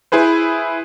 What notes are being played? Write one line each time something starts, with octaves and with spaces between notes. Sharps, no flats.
E4 G#4 B4 C5